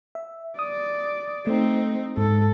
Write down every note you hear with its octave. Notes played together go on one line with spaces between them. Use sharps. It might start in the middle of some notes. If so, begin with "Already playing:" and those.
E5
D5 D#6
A3 C4 D#4
G#2 A4